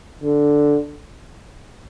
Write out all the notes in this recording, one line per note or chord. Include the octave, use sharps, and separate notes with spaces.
D3